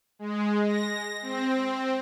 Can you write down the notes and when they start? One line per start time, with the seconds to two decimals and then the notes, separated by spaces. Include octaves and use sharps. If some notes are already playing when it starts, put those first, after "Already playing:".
0.19 G#3
0.66 A#6
1.22 C4